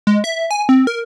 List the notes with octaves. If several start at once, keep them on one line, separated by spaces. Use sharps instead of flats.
G#3
E5
G#5
C4
A#4